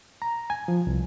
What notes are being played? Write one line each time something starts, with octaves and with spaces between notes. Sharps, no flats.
A#5
G#5
F3
C2